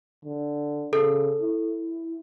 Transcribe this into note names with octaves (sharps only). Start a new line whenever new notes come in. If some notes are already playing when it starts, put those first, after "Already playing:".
D3
C#3 A4
E4